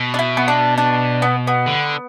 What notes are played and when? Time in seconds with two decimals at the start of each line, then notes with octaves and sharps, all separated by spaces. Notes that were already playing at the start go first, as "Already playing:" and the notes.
Already playing: B2
0.14 D4
0.19 E4
0.37 B3
0.48 D4
0.78 D4
1.22 B3
1.47 B3
1.66 D3